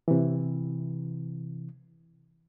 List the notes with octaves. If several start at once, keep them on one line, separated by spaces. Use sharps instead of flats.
C3 E3